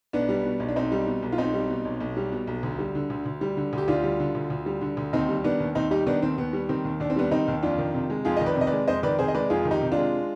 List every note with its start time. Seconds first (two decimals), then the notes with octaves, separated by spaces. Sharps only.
0.13 B1 B3 D4
0.29 G3
0.45 B2
0.60 B1
0.69 D4
0.76 B1 C4 D#4
0.92 G3
1.07 B2
1.22 B1
1.32 F4
1.38 B1 C4 D#4
1.54 G3
1.70 B2
1.85 B1
2.00 B1
2.17 G3
2.32 B2
2.47 B1
2.63 D2
2.79 G3
2.95 D3
3.10 D2
3.26 D2
3.41 G3
3.57 D3
3.73 D2 G4
3.88 D2 D4 F4
4.03 G3
4.20 D3
4.35 D2
4.50 D2
4.66 G3
4.81 D3
4.97 D2
5.13 D#2 C4 D#4
5.29 G3
5.44 D#3 B3 D4
5.60 D#2
5.75 D#2 C4 D#4
5.91 G3 D#4 G4
6.07 D#3 B3 D4
6.22 D#2 C4
6.38 D#2 B3
6.53 G3
6.69 D#3 C4
6.84 D#2
7.00 D#2 D4
7.10 C4
7.16 G3 B3 D4
7.31 D#3 C4 D#4
7.48 D#2
7.63 F2 D4 F4
7.79 D#3
7.94 C3
8.10 G#3
8.25 F2 F4 G#4
8.37 D#3 D#5
8.46 B4 D5
8.56 C3 D#5
8.67 B4 D5
8.72 G#3
8.88 F2 C5 D#5
9.03 D#3 B4 D5
9.19 C3 G#4 C5
9.28 D#5
9.35 G#3 B4 D5
9.50 F2 F4 G#4
9.65 D#3
9.71 D#4 G4
9.81 C3
9.92 G#3 D4 F4